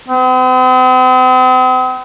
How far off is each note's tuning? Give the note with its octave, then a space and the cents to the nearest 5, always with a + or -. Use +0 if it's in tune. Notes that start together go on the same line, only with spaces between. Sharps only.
C4 -45